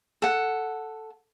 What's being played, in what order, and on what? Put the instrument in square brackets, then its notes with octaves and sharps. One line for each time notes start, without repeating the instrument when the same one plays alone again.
[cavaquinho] A4 F#5